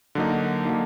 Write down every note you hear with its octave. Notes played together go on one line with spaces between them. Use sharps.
D3 F#3 A#3 D#4
D3 F#3 A#3 D#4